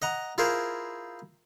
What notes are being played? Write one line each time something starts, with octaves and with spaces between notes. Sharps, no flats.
D#5 F#5 A#5
E4 F4 G#4 A#4 C5